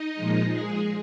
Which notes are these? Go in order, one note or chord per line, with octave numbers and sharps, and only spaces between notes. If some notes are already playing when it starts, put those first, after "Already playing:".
Already playing: D#4 D#5
A#2 F3 G#3
G#3 G#4